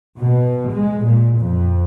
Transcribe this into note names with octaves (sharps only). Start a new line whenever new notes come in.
B2
G#3
A#2
F2